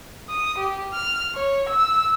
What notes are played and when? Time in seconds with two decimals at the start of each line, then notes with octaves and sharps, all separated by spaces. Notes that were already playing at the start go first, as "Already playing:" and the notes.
0.30 D#6
0.58 G4
0.93 F6
1.35 C#5
1.69 E6